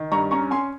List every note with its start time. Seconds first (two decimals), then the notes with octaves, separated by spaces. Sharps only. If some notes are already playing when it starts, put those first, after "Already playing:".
Already playing: D#3
0.11 G2 A#5 C#6
0.31 C#4 A#5 C#6
0.51 C#4 G#5 C6